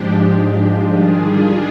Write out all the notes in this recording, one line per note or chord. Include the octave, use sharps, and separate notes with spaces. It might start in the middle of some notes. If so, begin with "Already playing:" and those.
Already playing: G#2 F3 G#3 D4 G4
D#3 G3 D4 F4 G#4